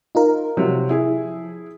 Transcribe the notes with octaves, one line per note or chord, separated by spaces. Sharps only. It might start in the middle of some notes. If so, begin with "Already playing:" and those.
D#4 F4 A#4
C3 F3 F#3
E4 G#4